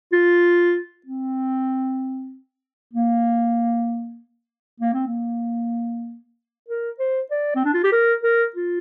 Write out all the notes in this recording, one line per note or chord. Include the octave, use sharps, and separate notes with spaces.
F4
C4
A#3
A#3
C4
A#3
A#4
C5
D5
C4
D4
F4
G4
A#4
A#4
F4